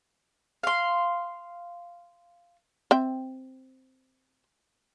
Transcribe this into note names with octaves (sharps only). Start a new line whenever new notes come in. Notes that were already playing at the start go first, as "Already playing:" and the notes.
F5 C6
C4 E5 G5